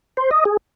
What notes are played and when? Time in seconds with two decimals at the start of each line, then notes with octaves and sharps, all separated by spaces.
0.17 C5
0.31 D#5
0.45 G#4